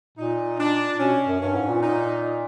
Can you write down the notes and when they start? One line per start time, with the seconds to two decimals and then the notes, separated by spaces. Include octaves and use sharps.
0.18 A#2 D#4
0.59 D4
1.00 B2 C#4
1.27 F#2
1.41 G2 C#4
1.55 G#2
1.69 A#2
1.82 D#4